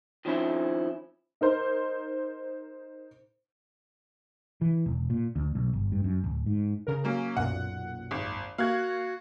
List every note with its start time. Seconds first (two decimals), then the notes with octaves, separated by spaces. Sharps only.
0.25 D#3 F3 C4 C#4 E4
1.41 D#4 A#4 C5
4.61 E3
4.86 E1
5.10 A#2
5.36 D2
5.55 B1
5.73 G1
5.92 G2
6.04 F#2
6.24 D1
6.46 G#2
6.87 C#3 A#4
7.04 F#3 A#3 C#4
7.37 B1 F#2 A#2 F#5
8.11 G#1
8.58 A#3 F#4 F5 F#6 G#6